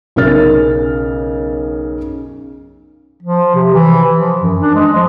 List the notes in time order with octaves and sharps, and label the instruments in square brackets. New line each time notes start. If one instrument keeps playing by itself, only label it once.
[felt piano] B1 C#3 A#4 F6 A6
[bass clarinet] F3
C3
E3
F3
F#2
D4
G#3
F3